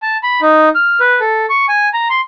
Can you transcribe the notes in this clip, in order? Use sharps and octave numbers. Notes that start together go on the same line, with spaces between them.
A5
B5
D#4
F6
B4
A4
C#6
G#5
A#5
C6